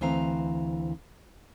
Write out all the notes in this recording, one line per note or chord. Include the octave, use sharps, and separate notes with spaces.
D2 E3 C4 F5 A#5